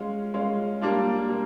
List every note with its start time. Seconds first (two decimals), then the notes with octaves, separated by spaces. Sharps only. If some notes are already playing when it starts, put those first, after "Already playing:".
Already playing: G#3 C#4 F4
0.34 G#3 C#4 F4
0.81 G3 A#3 D4 F4
1.29 G3 A#3